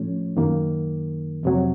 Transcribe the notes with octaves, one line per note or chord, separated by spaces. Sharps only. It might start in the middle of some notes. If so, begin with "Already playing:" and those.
Already playing: A2 F3 A3 C#4
F#2 D#3 A#3
F2 C3 F#3